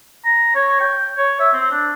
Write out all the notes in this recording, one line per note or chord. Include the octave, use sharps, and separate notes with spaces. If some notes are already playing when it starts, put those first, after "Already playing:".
A#5
C#5
G5
C#5
E5
C4
D4